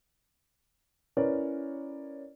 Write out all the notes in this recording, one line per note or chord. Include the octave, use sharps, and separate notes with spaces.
C#4 E4 A#4 B4 C#5 D5